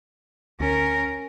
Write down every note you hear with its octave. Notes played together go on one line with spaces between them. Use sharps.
D2 C#4 A#4